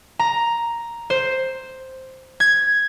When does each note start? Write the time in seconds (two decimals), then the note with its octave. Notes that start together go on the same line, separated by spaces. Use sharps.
0.19 A#5
1.10 C5
2.40 G#6